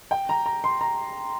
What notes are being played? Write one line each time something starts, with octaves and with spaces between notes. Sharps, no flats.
G5
A#5
A#5
C6
A#5